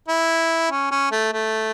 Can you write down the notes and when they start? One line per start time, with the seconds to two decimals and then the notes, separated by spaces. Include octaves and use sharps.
0.08 E4
0.71 C#4
0.91 C#4
1.11 A3
1.33 A3